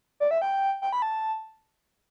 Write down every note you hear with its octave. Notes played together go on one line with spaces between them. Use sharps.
D5
E5
G5
G5
B5
A5